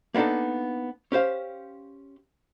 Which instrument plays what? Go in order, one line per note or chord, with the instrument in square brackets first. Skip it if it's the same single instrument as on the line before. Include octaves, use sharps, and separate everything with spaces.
[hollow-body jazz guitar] A#3 B3 D4 D#4 A4
C#4 G4 C5 F5